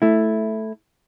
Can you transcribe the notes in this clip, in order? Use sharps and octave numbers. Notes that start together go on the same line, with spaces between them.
A3 E4